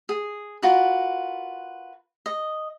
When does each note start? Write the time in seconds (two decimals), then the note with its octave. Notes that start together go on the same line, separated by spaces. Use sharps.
0.09 G#4
0.62 F4 F#4 A#4 B4
2.26 D#5